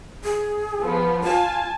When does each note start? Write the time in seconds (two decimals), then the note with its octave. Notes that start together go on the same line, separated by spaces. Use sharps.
0.24 G#4
0.82 F3 B3
1.24 F4 G#5 A5